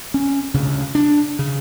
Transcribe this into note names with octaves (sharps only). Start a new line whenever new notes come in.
C#4
D2 C#3
D4
C#3